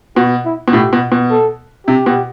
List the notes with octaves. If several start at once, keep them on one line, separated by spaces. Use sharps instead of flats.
B2 F#4
E4
B2
A2 G4
B2
B2
A4
C3 G4
B2